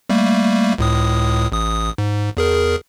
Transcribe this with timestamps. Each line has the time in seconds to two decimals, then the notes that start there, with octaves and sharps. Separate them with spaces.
0.09 G3 A3 A#3
0.78 C#2 A2 D#6
1.52 A1 D#6
1.98 G#2
2.37 E2 G#4 A#4